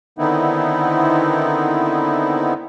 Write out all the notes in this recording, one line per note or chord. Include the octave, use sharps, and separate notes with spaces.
D3 D#3 B3 C4 D#4 E4